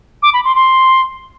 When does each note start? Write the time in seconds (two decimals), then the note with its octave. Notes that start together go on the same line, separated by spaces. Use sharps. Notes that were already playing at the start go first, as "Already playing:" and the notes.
0.23 D6
0.34 B5
0.45 C6
0.56 C6